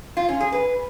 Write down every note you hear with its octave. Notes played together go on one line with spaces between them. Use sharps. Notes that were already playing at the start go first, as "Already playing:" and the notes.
F4
C#4
G#4
B4